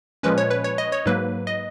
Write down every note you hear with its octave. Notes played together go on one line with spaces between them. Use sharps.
A#2 F3 G#3 C#4 B4
C#5
B4
C#5
D#5
C#5
G#2 F#3 A#3 B4
D#5